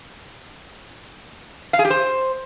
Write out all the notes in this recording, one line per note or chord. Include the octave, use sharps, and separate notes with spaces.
F5
G#4
G4
C5